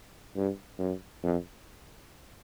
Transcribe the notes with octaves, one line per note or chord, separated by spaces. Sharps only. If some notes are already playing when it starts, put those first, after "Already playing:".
G2
F#2
F2